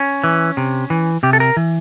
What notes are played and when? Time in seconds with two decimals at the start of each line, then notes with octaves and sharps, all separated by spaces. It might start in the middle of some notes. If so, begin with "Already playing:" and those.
Already playing: C#4
0.24 E3
0.57 C3
0.90 E3
1.23 C3 G4
1.33 A4
1.40 A#4
1.57 E3